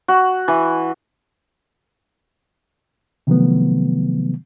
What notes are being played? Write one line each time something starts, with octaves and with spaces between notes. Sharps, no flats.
F#4
E3
C3 D#3 F3 F#3 A3 B3